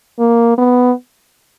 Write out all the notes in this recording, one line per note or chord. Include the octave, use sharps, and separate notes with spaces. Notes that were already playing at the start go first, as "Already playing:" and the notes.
A#3
B3